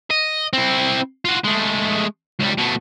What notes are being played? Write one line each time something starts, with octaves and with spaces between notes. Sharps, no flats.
D#5
C4 E4
F4 F#4
G#3 A3
C#2 G3
B2 A3